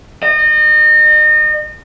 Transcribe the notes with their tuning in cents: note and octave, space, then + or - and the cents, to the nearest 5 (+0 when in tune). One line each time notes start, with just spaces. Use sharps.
D#5 -35